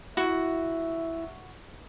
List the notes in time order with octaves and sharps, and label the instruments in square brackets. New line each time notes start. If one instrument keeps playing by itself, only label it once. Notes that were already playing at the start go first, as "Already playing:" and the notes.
[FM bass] E4 [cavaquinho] F#4 [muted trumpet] E5